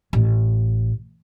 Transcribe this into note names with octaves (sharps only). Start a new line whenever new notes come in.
A1